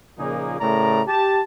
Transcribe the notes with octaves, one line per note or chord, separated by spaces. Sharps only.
A#2 C#3 F3 A#3 D#4 G#4
A2 C#3 A3 A#4 D5 A#5
G4 A5